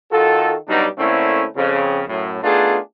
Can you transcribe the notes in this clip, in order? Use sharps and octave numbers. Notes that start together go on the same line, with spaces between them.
D#3 F4 F#4 A4
G2 B2 F#3 G3 D4 D#4
D3 A3 A#3 C4 C#4 E4
F2 C#3
F#2 A2
A3 B3 D4 D#4 F4 G#4